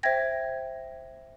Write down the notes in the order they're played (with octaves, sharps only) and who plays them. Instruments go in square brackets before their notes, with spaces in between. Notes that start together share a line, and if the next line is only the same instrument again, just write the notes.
[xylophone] C5 E5 G5 G#6 A#6